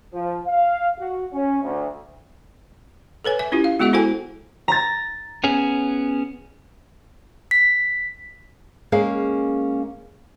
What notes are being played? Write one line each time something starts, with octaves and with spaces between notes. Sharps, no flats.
F3
F5
F#4
C#4
D2
A4 B4 C#5 G#5
E5 G#5
C#4 E4 F4 G4
F5
G#3 B3 F#4 G#4 E5 F#5
E4 F#4 A4 C5 G5 G#5
A#5 A6
B3 C#4 G#4
B6
G#3 A#3 C#4 G#4 F5